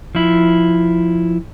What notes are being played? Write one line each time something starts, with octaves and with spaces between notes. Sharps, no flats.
F3 E4